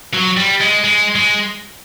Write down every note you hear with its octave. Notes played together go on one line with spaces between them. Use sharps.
F#3
G3
G#3
G#3
G#3